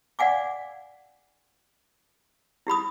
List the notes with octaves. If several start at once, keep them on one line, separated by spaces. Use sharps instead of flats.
D5 F5 F#5 G#5 D6
E4 G4 B5 D#6